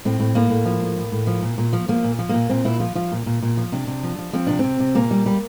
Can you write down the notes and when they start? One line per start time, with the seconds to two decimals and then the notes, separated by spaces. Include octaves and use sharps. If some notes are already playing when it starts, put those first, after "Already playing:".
0.05 A2 C4
0.20 A2
0.35 A2 A#3
0.50 A2
0.65 F3
0.82 A2
0.96 A2
1.12 A2
1.27 F3
1.42 A#2
1.58 A#2
1.73 F3
1.88 F3 A#3
2.04 A#2
2.19 F3
2.29 A#2 A#3
2.49 A#2 C4
2.65 A#2 E4
2.80 F3 F4
2.95 F3 F4
3.12 A#2
3.26 A#2
3.42 A#2
3.57 F3
3.72 C3 D4
3.87 C3
4.03 F3
4.18 F3
4.33 F3 C4
4.47 C3 D4
4.59 C3 C4
4.80 C3
4.95 A#2 A#3
5.11 G3
5.26 G3